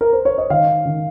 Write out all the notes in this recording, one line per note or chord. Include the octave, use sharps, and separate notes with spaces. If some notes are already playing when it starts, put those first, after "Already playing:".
A#4
C5
C#5
D#5
D#3 F5
D#3